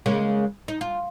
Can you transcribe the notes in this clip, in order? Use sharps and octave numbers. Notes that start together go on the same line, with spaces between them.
C#3 G#3 A#3
D#4
F4